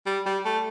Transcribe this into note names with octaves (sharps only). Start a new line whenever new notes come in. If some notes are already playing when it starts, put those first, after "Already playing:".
G3
G3
A3